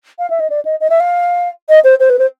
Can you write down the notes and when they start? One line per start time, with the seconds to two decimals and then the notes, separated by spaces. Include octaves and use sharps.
0.19 F5
0.30 E5
0.40 D#5
0.50 D5
0.65 D#5
0.80 D#5
0.90 E5
1.00 F5
1.69 D#5
1.84 C5
2.00 C5
2.09 B4
2.19 C5